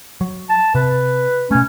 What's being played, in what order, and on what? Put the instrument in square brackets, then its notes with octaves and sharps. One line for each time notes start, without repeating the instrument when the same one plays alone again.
[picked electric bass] F#3
[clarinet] A5
[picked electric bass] C3 [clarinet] B4
[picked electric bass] B2 A3 [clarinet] C#4